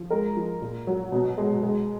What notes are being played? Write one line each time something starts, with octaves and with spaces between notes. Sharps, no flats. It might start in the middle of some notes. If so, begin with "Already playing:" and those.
Already playing: F3
G#3 A#4
F3
A#2
F#3
B2
G#3
G#3